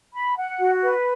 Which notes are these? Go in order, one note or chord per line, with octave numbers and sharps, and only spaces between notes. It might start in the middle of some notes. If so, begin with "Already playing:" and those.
B5
F#5
F#4
B4